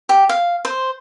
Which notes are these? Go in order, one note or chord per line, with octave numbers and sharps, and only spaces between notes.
G4
F5
C5